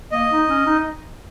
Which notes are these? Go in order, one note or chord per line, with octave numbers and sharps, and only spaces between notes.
A#3 D#5
D#4
C#4
D#4